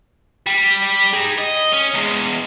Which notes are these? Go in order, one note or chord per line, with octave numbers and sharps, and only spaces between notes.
G3
G#4 A#5
D#5
C#4
E2 G#3